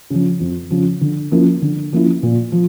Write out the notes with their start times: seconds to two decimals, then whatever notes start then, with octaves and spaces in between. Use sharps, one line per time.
0.10 C#3 F3
0.40 F2
0.71 C#3 F3
1.01 D3
1.32 F3 A#3 C#4 E4
1.62 D3
1.93 F3 A#3 C#4 E4
2.23 A#2
2.52 F3